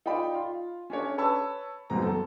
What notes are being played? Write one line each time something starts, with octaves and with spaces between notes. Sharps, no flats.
D#4 F4 D5 G5 B5
F4
C#4 D4 C#5
B4 C#5 A5 B5 E6
F#1 F#2 B2 C4 A#5
A4